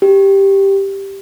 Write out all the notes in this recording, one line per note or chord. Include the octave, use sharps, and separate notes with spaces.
G4